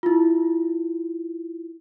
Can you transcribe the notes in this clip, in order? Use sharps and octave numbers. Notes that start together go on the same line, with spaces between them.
E4 F4